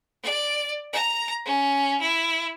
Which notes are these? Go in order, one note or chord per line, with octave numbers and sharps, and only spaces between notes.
D5
A#5
C#4
E4